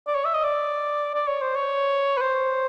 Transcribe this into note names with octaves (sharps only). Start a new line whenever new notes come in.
D5
C#5
E5
D#5
D5
D5
C#5
C5
C#5
B4
C5